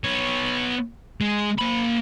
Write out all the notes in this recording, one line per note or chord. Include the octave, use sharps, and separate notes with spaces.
B3 C#5
G#3
A#3 B5